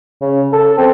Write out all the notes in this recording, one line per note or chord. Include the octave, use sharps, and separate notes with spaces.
C#3
A4
C4